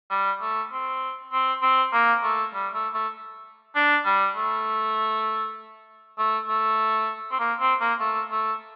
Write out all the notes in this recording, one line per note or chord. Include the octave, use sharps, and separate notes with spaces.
G3
A3
C4
C4
C4
A#3
A3
G3
A3
A3
D4
G3
A3
A3
A3
C4
A#3
C4
A#3
A3
A3